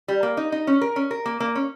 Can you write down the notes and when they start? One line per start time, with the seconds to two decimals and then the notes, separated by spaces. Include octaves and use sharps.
0.08 G3
0.23 A#3
0.37 D#4
0.52 D#4
0.67 C#4
0.81 A#4
0.96 C#4
1.11 A#4
1.26 A#3
1.40 A#3
1.55 C#4